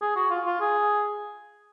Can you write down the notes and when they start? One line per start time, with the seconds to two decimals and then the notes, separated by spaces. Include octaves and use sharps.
0.01 G#4
0.16 F#4
0.30 F4
0.46 F4
0.60 G#4